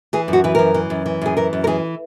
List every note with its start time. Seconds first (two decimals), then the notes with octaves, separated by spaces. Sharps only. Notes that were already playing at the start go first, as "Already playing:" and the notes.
0.13 E3 G#4
0.28 F#2 F#4
0.44 E3 B4
0.55 F#2 A#4
0.74 E3
0.90 F#2
1.06 E3
1.21 F#2 G#4
1.37 E3 A#4
1.53 F#2
1.64 A#4
1.67 E3 G#4